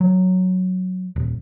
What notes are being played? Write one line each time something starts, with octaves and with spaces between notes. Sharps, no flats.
F#3
D#1